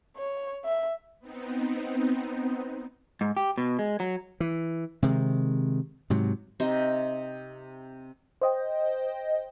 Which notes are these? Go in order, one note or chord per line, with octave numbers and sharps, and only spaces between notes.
C#5
E5
B3 C4 D#4
G#2
G4
B2
G#3
F#3
E3
C3 D#3 G#3
G#2 C3 F#3
C3 D#4 C5
C5 D#5 G5